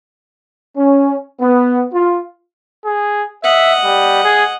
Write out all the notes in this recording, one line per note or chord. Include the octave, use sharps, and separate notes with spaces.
C#4
B3
F4
G#4
D#5 E5 F#5
G3
G#4